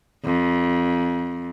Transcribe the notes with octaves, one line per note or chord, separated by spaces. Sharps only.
F2